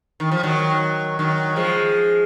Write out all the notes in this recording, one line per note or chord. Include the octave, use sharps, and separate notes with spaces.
D#3
F3
D#3 F#3
D#3 F#3
F3 G#3